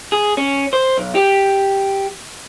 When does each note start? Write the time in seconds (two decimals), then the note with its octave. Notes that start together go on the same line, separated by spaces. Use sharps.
0.12 G#4
0.37 C#4
0.73 C5
0.98 B1
1.15 G4